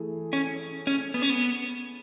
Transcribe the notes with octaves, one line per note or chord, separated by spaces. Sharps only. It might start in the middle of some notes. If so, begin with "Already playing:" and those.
Already playing: E3 A3 E4 G#4
C#4
C#4
B3
C#4
B3